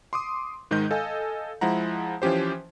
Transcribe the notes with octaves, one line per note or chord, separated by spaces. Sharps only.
C6 D6 D#6
G#2 D#3 G#3 D#5 G6
A4 D#5 F5 G#5
F3 G#3 E4 F#5 A#5
E3 F3 C#4 G4 C5